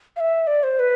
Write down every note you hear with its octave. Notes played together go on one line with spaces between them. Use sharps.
F5
E5
D5
C5
B4